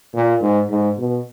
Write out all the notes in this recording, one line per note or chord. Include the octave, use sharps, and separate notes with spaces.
A#2
G#2
G#2
B2